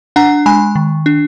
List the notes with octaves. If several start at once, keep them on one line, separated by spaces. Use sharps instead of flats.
D4 F#5 A#5
G#3 G#5 B5
D#3
D4